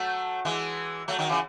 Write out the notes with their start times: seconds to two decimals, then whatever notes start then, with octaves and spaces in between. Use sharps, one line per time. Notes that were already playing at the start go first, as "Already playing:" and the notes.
Already playing: F#3 A3
0.45 E3 G#3
1.08 F#3 A3
1.18 D#3 F#3
1.29 C#3 E3